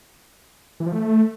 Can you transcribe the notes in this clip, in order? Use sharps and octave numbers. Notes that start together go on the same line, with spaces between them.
E3
F3
A3